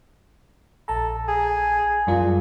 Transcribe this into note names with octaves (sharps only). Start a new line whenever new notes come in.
A#1 A4 A5 A#5
G#4
F#2 A#2 G3 F4